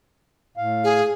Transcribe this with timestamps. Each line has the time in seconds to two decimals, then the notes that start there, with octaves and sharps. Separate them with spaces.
0.57 A2 F5
0.84 G#4